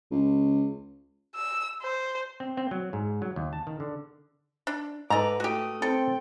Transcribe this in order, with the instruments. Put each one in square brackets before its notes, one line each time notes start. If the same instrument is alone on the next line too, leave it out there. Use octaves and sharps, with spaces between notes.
[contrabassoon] C#2
[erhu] E6
C5
[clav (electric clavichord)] C4
C4
F#3
G#2
F#3
D#2
A5
D#3
D3
[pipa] D4
[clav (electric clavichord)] G#2 [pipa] A4 A#5 [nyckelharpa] B4 D6
[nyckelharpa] A3 D#6 [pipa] F#4 G4
[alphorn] C4 [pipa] A4 [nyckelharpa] G5